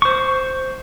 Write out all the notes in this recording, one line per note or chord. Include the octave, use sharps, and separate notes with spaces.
C5 C#6